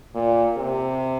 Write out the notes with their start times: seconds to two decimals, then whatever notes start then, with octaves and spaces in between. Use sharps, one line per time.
0.15 A#2
0.57 C3